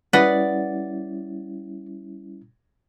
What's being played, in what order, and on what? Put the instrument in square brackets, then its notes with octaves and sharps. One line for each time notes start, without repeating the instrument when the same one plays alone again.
[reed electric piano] G3 C#4 E4 [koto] B4 D#5 [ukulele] D5 F#5